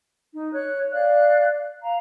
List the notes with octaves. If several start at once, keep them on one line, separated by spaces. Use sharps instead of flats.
D#4
C#5 F#6
D5 F5 F#6
F5 A#5